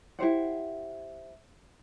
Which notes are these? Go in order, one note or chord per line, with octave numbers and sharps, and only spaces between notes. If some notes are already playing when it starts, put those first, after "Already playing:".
E4 G4 C5 F#5